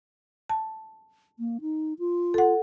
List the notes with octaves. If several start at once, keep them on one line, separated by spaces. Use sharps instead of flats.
A5
A#3
D#4
F4
A4 F#5